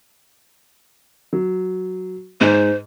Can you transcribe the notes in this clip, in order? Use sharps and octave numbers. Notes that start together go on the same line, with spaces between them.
F#3
G#2 C5